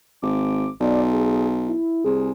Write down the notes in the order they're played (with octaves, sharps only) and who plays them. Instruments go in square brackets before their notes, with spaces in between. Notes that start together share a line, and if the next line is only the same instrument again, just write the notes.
[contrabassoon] G#1 [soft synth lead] D6
[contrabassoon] B1 [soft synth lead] D5
[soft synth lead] G#4
E4
[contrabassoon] C2 [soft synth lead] G#4